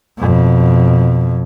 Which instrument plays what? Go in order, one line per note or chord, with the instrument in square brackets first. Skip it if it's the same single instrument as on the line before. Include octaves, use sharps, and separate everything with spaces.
[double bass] F2 B2